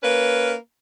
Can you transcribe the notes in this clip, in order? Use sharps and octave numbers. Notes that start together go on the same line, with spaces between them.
A#3 C#4 B4